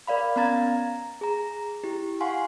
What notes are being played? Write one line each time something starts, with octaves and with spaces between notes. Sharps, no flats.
A#4 D5 F5 B5
B3 C#4 F5 A#5 G#6 A6
A#5
G#4 A#5
E4 G4
F5 F#5 G#5 C6 C#6